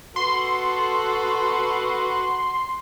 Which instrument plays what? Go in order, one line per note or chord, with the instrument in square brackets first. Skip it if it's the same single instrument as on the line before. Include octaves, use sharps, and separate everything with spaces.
[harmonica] F#4 B4 [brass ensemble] A4 [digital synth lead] C6